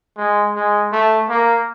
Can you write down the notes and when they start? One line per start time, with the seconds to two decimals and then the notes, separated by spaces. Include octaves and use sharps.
0.18 G#3
0.55 G#3
0.92 A3
1.29 A#3